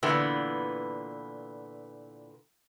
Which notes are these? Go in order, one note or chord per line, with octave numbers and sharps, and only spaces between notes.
A#2 D3 E3 B3